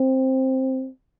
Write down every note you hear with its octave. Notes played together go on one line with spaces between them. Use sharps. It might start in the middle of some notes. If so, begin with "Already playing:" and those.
Already playing: C4